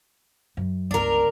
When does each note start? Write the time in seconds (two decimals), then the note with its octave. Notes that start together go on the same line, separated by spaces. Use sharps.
0.57 F#2
0.91 G1 C#2 D4 A#4